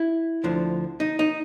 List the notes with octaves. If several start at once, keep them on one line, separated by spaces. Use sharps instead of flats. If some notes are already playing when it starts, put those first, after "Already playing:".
Already playing: E4
D2 D3 F3
D#4
D#4